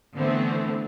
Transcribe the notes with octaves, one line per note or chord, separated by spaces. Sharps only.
D3 E3 A3 B3 C4